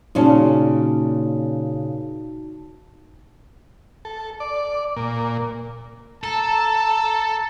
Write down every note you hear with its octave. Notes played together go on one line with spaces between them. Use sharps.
A#2 C#3 C#4 D#4 F#4 A5
A4
D5
A#2
A4 A5 A#5